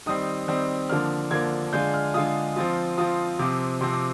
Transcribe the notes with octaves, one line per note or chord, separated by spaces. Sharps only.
D#3 G3 C4 D#6
D#3 G3 C4
D3 F3 A#3 D4 F6
D3 F3 A#3 D4 G#6
D3 G#3 D4 F4 G6
F6
D3 G#3 D4 F4 D#6
F3 C4 F4
F3 C4 F4 D#6
C3 F3 C4 D6
C3 F3 C4 C6
D6